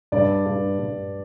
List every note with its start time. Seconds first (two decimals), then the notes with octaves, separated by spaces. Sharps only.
0.12 G2 D5
0.46 G2
0.78 G2